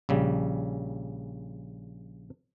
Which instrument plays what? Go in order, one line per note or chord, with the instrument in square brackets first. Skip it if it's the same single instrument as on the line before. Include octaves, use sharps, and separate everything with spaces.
[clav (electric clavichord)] A#1 C#3 G3